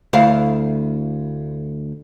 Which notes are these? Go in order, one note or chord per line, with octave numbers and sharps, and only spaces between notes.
D2 E4 F5